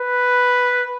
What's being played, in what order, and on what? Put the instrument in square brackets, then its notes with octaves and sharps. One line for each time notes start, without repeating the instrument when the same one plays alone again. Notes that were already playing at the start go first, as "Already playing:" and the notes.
Already playing: [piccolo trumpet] B4